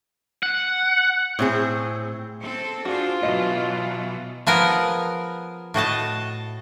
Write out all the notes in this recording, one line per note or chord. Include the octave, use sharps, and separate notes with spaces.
F#5
A2 C4 G#4
C4 A4
D4 F4 F#4 G#4 C5
B2 E3 F#3 D#5
F3 B3 G#4 A#4
A2 F#4 D#5 A5